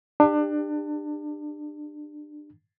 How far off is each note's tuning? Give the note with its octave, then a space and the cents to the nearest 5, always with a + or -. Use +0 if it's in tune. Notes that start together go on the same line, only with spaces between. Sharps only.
D4 +25 G4 +30